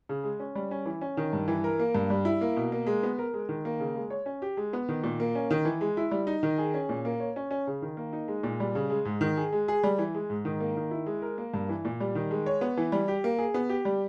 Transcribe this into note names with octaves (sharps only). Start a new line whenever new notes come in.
C#3
G#3
C#4
G3
C#4
E3
C#4
D#3
G2
E3
A#4
A#3
G2
G3
E4
A#3
B2
A#3
G#3
B3
A#4
G#3
D#3
A#3
C#3
G#3
C#5
C#4
G4
G#3
B3
D#3
A#2
A#3
C#4
D#3
E3
G#3
E4
G3
D#4
D#3
G#4
C#4
A#2
A#3
C#5
C#4
C#4
C#3
D#3
A#3
D#4
G#3
A#2
G3
C#3
G#3
G#2
D#3
G#4
G#3
G#4
G3
E3
G#3
G#2
D#3
A#3
D#3
E4
G#3
A#4
A#3
G2
E3
A#2
G3
D#3
G#3
C#5
B3
E3
G3
G4
A#3
G#4
B3
G4
G3